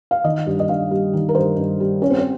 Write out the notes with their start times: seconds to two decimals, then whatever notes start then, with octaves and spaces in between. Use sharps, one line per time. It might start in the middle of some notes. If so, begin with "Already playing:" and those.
0.11 F5
0.24 D#3 D#5
0.46 G2
0.60 D#5
0.69 G2 F5
0.91 G3
1.13 D#3
1.29 A#4
1.35 G2 C5
1.57 G2
1.80 G3
2.02 G3 C#4
2.10 C4
2.18 C#4